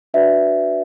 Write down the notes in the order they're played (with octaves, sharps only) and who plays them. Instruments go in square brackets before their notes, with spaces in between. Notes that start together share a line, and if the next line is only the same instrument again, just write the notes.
[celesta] D4 F#4 B4 D5 E5